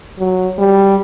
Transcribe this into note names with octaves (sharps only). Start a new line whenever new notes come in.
F#3
G3